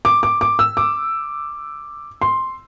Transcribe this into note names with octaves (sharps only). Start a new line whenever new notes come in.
D6
D6
D6
E6
D6
C6